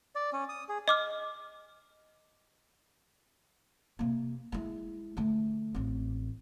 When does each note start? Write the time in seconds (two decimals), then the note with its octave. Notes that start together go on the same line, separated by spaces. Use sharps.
0.15 D5
0.33 C#4
0.49 D#6
0.69 G#4
0.88 D#5 D6 F6
3.99 C3 A#3
4.52 G#3 E4
5.17 D3 A3
5.75 A1 C4